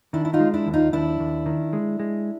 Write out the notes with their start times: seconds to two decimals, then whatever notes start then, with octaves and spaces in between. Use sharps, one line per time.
0.13 D#3 D4 E4
0.25 E4
0.33 D#4 F4
0.40 G#3
0.53 D4 E4
0.66 D#2
0.74 D#4 F4
0.93 D#2 D4 E4
1.20 D#2
1.46 D#3
1.73 G#3
2.00 G#3